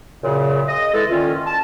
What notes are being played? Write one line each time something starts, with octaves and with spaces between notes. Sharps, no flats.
F#2 A#2 C#3
D#5
E3 G#3 A4
A#2 D#3 C#4 F4
A5